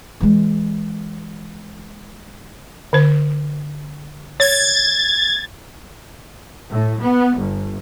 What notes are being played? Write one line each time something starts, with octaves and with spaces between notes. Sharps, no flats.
E3 G#3
D3 C5
C#5 G#6 A6
A2
B3
G1